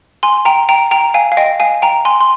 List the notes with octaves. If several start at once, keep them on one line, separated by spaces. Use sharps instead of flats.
G#5 C6
G5 A#5
G5 A#5
G5 A#5
F5 G#5
F5
D#5 G5
F5 G#5
G5 A#5
G#5 C6
C6